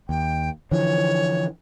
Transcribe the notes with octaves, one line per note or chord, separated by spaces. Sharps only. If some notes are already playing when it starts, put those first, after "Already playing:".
D#2 G5
D3 E3 F3 C#5